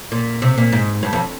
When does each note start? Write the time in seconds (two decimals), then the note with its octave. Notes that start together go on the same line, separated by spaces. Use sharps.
0.12 A#2
0.42 C3
0.58 A#2
0.72 G#2
1.03 G2
1.13 F2